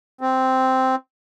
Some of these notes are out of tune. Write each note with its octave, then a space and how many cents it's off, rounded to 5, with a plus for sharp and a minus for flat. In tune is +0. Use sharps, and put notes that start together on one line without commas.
C4 -5